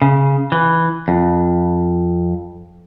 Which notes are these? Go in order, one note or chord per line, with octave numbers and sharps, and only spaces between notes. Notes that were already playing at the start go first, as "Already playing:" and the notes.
C#3
E3
F2